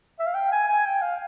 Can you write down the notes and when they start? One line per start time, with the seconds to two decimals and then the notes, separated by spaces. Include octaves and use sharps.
0.19 E5
0.26 F5
0.35 G5
0.52 G#5
0.68 G#5
0.86 G5
1.02 F5